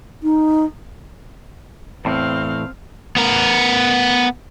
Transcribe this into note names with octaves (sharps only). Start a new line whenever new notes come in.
D#4
E2 A2 C4 F5
B3 A#4